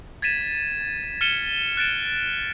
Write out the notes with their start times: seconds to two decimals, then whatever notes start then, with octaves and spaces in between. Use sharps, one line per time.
0.22 G#6 A6 B6 D#7 E7
1.21 F6 A6 C#7 D#7 E7 G7
1.77 F#6 A6 D7 E7